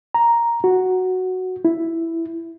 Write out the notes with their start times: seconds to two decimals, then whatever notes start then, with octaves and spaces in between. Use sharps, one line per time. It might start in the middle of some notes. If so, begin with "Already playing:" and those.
0.14 A#5
0.64 F#4
1.65 E4